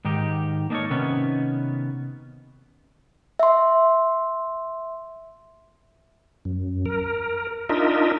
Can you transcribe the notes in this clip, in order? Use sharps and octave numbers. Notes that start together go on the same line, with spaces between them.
G#2 D#3 D#4 G4
A#3 D4 D#4 A4 A#4 C#5
C3 D#3 B3 C#4
E5 C6
F#2
A#4
D4 D#4 F4 A#4 D#5 E5